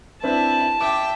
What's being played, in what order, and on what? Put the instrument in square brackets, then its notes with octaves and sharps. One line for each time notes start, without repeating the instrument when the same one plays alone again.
[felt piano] C4 D4 B4 [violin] E4 [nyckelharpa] A5
[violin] E5 G5 [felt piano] D6